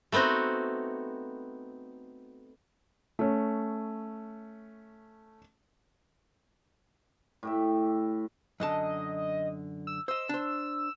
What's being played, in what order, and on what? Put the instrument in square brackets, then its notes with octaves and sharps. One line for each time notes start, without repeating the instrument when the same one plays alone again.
[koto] A3 B3 C4 D#4 F#4
[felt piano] A3 C#4
[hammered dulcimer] A2 G4 E5
[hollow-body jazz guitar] F#2 D3 A5 [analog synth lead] D#5
[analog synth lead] E6
[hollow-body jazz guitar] C5 D#5 [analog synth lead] E6
[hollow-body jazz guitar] D4 C5